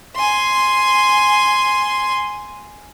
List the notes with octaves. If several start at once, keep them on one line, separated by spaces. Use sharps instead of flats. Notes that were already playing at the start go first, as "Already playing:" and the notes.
G#5 C6